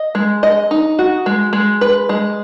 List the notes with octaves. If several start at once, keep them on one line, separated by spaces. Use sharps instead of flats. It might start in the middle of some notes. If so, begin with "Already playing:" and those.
Already playing: D#5
G#3
D#5
D#4
F#4
G#3
G#3
B4
G#3